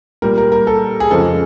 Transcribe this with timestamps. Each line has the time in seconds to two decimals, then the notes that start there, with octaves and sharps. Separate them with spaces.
0.22 A#2 G3 A#4
0.38 A#4
0.52 A#4
0.67 A4
1.00 G#4
1.10 F2 C#3 F3 G#3 A4